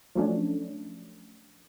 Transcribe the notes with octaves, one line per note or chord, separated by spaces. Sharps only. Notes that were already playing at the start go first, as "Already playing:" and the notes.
F3 F#3 A3 C#4 D4